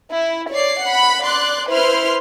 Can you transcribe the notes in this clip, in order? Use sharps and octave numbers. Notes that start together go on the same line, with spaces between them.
E4
C#5 D5 C7
F#5 B5
D5 C6 F#6
E4 B4 C5 C6 F6